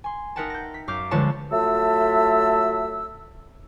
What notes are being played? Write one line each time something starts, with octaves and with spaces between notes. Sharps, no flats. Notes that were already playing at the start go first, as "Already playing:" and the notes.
G#5 C6
D#4 A#4 E5 F#5 G5 A5
G6 A#6
B6
F#2 F5 D6 G6
G1 C#2 D3 F3 C#5 A5
F#3 A3 F4 E5 A5 E6